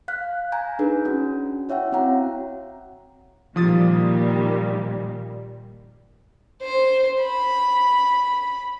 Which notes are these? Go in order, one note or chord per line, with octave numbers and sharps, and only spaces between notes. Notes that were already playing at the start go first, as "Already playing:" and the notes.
F5 F6 F#6 B6
G#5 A#5 G6
D4 D#4 G#4 B4
C#4 F#4
E4 C#5 E5 F#5 G5
C4 F#4 F5 F#5 A#5
A#2 D#3 F3 G3 D#6 A6
C5
B5